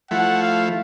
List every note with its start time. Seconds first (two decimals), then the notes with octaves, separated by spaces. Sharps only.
0.11 F3 A3 E4 F#5
0.42 F5